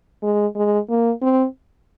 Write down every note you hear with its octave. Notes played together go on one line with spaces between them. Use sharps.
G#3
G#3
A#3
C4